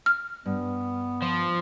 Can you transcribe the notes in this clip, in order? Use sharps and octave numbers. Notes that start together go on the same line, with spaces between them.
F6
G2 B3
F3